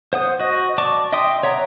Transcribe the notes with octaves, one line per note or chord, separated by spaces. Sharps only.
C5 F#5 D#6
F#4 D#5
D5 A5 C#6 D6
D#5 E5 G5 C6 D#6
C#5 E5 F#5 A#5